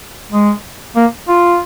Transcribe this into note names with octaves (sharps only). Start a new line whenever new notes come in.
G#3
A#3
F4